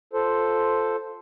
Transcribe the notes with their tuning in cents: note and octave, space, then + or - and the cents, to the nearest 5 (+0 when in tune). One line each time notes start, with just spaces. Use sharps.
F4 +0 A4 +0 C5 +0